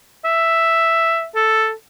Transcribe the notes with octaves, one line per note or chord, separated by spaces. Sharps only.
E5
A4